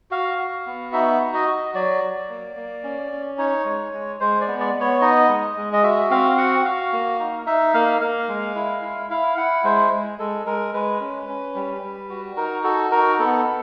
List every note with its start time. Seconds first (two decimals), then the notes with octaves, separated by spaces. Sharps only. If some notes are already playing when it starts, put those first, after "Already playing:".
0.11 F#4 F5
0.38 F#4
0.66 B3
0.93 D#4 E5
1.20 F#4
1.34 D#5
1.48 F#4
1.74 F#3 D5
2.02 F#3
2.30 A#3
2.56 A#3
2.84 C#4
3.12 C#4
3.38 D#4 C#5
3.65 G#3
3.93 G#3
4.20 G#3 C5
4.41 D5
4.48 B3
4.60 D5
4.74 B3
4.81 C#5
5.01 D#4 D#5
5.29 G#3
5.57 G#3
5.73 D#5
5.83 F#4 E5
6.10 C4 F5
6.37 F#4 F#5
6.65 F#4 F5
6.93 A#3
7.20 D#4
7.46 D#4 E5
7.74 A#3 F5
8.01 A#3 F5
8.28 G#3
8.55 E4
8.82 E4
9.10 E4 F5
9.37 E4 F#5
9.64 G#3 C5
9.92 G#3
10.19 G#3 A4
10.46 G#3 A#4
10.74 G#3 B4
11.00 C#4
11.29 C#4
11.55 G3
11.82 G3
12.10 F#4
12.37 D#4 A#4
12.64 F#4 A4
12.91 D#4 A#4
13.19 B3 A4
13.46 B3